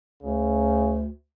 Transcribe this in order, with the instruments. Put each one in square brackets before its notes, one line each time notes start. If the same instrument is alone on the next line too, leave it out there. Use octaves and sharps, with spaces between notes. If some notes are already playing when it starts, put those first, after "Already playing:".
[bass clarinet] D2 [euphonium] C#3